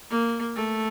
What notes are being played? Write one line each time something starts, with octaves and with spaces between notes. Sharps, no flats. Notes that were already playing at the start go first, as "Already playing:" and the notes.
A#3
A3